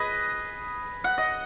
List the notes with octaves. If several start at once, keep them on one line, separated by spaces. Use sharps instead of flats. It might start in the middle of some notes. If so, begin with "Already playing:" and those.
Already playing: G#4 B4 D#5
F#5
D#5